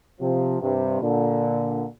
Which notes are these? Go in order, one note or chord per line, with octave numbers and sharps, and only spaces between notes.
C3 F3
G2 C3
A#2 D3